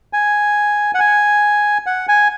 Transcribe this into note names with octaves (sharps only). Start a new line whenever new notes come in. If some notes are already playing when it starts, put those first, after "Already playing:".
G#5
F#5
G#5
F#5
G#5